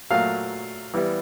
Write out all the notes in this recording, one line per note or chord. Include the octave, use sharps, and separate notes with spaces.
A#2 F#3 A3 F5
E3 G3 B3 E4